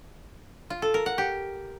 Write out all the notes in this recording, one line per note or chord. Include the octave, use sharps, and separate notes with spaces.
F4
A4
A#4
F#5
G4